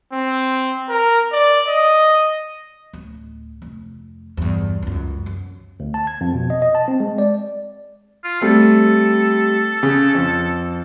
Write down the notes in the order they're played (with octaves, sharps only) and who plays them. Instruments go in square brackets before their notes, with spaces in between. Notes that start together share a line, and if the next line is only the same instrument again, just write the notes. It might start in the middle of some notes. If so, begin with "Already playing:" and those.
[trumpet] C4
A#4
D5
D#5
[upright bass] D1
F1
E2 G2
C#2 F#2
F#2
[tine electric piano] D2
A5
G#6
F2
B2
D#5
D#5
A5
C4
G#3
D5
[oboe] F4
[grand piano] G3 A3 C4 [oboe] A4
[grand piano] C#3
F2